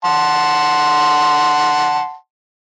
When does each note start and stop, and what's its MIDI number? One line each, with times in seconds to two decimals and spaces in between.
0.05 2.15 78
0.05 2.15 81
0.05 2.15 84